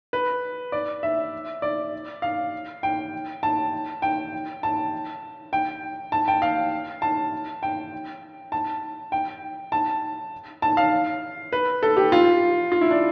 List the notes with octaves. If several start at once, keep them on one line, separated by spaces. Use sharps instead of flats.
B4
D5
E5
D5
F5
G5
A5
G5
A5
G5
A5
G5
F5
A5
G5
A5
G5
A5
A5
F5
B4
A4
G4
F4
F4
E4
D4